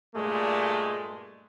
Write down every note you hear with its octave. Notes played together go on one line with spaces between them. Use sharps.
G2 A#2 G#3 A3